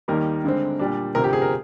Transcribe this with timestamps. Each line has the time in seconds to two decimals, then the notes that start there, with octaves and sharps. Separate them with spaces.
0.08 D#2 D#3 G3 A#3 D#4 A#4
0.44 G2 D3 G#3 C4
0.79 A#2 G3 D4
1.15 D2 C3 F3 C4 A#4
1.24 G4
1.33 G#4
1.42 A#4